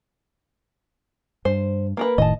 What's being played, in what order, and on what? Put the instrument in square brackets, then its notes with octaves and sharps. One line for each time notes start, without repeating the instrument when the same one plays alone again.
[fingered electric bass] G2 [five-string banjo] C5
[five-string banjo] A#3 A#4 B4
[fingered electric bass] F1 A2 D#3 [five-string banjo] D#5 A5